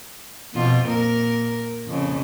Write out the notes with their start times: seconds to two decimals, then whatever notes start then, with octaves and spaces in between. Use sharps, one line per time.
0.54 F2 B2 F4
0.85 A#2 A#4
1.87 F2 C#3